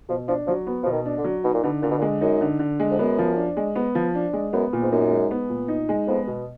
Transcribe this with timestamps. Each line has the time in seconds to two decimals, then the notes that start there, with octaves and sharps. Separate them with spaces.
0.09 B2 F3
0.28 F3 D4
0.47 F3 F#3
0.67 B3
0.83 B2 F3
0.92 D#3
1.06 D4
1.18 D3
1.24 F#3
1.44 B2 D#4
1.54 A#2
1.63 B2 D3
1.82 A#2 D3
1.91 B2
1.98 A#2
2.02 G#3
2.21 F#2 D#4
2.41 D3
2.59 D3
2.80 G#3
2.91 F2
2.98 F#2 B3
3.18 F3
3.37 D4
3.57 G#3
3.76 B3
3.95 F3
4.15 D4
4.33 G#3
4.53 F#2 B3
4.73 A#2
4.82 G#2
4.92 F#2 D#4
5.11 G#3
5.31 B3
5.50 A#2
5.68 D#4
5.89 G#3
6.07 F2 B3
6.27 B2